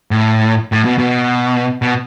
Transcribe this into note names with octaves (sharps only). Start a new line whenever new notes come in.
A2
A2
B2
B2
B2